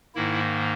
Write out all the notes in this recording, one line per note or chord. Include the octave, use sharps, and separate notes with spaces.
G#2 D#3 A#3 E4